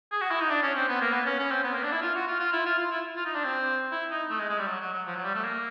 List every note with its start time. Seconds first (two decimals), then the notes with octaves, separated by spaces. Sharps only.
0.12 G#4
0.21 F#4
0.31 E4
0.40 D#4
0.50 D4
0.62 C#4
0.75 C4
0.88 B3
1.01 A#3
1.13 B3
1.26 C#4
1.39 C#4
1.51 C4
1.64 B3
1.74 A#3
1.83 D4
1.92 E4
2.02 F4
2.15 F#4
2.27 F4
2.39 F4
2.53 E4
2.66 F4
2.78 F4
2.91 E4
3.16 F4
3.25 D#4
3.35 D4
3.44 C4
3.92 E4
4.11 D#4
4.30 A3
4.39 G#3
4.49 G#3
4.58 G3
4.67 F#3
4.81 F#3
4.93 F#3
5.06 F3
5.15 F#3
5.24 G3
5.35 A3
5.44 A#3